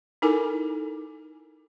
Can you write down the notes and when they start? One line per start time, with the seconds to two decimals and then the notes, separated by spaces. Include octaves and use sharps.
0.22 D#4 E4 A4 A#4 G#5 D6